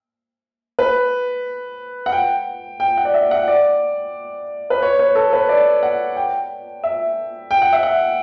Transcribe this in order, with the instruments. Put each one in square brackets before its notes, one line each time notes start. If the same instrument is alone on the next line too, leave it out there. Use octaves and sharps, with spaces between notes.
[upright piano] B4
F#5
G5
G5
F#5
D5
E5
F#5
D5
B4
C#5
B4
A4
B4
D5
F#5
G5
E5
G5
F#5
E5
F#5